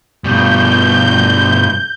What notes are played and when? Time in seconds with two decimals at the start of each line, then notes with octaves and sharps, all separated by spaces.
0.24 G2 B2 G6